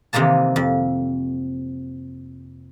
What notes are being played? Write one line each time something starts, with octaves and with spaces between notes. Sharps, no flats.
C3 D#3 E3 A#3 A5
F2